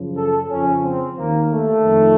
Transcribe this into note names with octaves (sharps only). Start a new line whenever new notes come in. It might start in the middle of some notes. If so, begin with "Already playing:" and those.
Already playing: F#2 C#3 F3
A4
F2 C#3 F3 C#4
C4
D#2 D#3 A#3
A3
F2 D#3